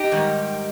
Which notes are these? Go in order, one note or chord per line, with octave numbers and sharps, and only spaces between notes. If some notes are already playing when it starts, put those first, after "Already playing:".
Already playing: D#4 G4
G#2 D#3 G3